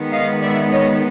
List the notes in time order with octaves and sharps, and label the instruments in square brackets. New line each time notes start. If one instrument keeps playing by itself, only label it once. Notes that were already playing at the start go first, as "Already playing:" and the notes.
Already playing: [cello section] D#3 G#3 B3
D#5 F5
D5 E5
C#5 D#5